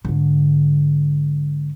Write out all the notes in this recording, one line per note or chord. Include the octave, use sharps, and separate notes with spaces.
G#2 D3